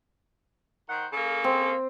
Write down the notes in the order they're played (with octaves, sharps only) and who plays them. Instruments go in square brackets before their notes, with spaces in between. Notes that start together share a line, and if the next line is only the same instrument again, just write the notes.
[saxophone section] D#3 C5 F#5
C#3 A#3 A4
[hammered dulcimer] C4